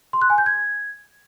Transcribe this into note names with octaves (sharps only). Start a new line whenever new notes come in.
C6
F#6
G#5
G6
G#6